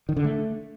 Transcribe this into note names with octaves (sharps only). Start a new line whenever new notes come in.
D#3
D3
A3